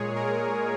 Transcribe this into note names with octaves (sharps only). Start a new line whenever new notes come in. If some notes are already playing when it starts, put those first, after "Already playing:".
Already playing: A#2 G#3 G#4 C#5
A#4